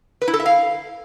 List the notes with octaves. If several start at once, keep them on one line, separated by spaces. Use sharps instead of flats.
B4
E4
A4
E5
F5